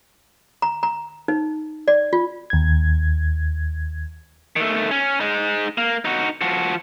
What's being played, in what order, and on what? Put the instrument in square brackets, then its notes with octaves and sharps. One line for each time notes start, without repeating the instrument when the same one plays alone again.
[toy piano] A#5
A#5
D#4
D5
F4
[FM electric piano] D#2 G#6
[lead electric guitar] D#3 A3
C#4
G#3 D#4
A#3
D#4 F#4
F3 F#4